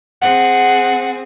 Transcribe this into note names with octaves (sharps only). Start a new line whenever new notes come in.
C4 G#4 F#5